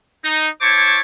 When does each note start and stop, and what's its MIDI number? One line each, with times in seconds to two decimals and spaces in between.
0.24 0.48 63
0.61 1.00 64
0.61 1.00 72
0.61 1.00 73
0.61 1.00 81
0.61 1.00 85
0.61 1.00 86